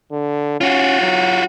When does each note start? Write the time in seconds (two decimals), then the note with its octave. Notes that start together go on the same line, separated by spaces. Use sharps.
0.12 D3
0.61 C#4 F4 F#4
1.02 F#3